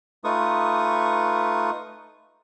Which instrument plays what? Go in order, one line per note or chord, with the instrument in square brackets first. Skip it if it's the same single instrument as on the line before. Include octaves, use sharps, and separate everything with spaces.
[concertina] A3 D#4 F4 B4 C#6 D#6